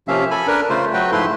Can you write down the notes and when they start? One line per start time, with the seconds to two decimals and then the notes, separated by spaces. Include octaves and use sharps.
0.08 C3 F3 A#3 C#4 E5 F5
0.31 A4 G#5 B5
0.47 D4 A#4 B4
0.70 C#3 A3 F4 C5
0.94 F#3 A3 F#4 B4 G5
1.12 G#2 F3 A3 E4 B4 C6